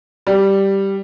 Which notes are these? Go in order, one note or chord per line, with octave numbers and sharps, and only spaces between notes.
G3